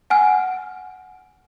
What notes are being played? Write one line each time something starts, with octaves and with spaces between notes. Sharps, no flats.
F#5 G#5 F6